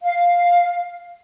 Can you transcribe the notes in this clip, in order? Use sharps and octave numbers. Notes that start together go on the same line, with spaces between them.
F5